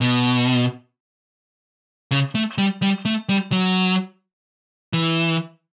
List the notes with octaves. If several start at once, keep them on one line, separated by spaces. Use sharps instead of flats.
B2
C#3
A3
G3
G3
A3
G3
F#3
E3